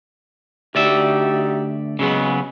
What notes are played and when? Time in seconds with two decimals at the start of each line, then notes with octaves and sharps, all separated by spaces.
0.75 D2 D#4 F#4 G4 D5 E5
1.99 C#3 F#3 G#3 B3